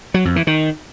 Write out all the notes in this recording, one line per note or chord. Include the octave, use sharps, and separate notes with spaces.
F#3
F2
E3
D#3